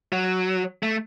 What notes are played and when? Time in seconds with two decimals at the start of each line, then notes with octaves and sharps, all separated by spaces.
0.12 F#3
0.83 A3